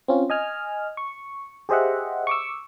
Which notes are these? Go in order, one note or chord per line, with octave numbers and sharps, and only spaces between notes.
C4 C#4 F4
D#5 G#5 F6
C#6
G4 G#4 C5 D#5 E5 F#5
C#6 D6 E6